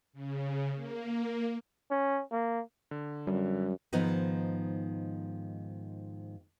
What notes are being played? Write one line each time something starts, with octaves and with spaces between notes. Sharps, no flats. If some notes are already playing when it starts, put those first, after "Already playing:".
C#3
A#3
C#4
A#3
D3
F#2 G3
G#2 D#3 F3 B3 D#4